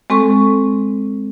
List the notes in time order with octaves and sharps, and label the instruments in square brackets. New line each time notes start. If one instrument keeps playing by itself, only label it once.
[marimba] G#3 C4 A4 C#6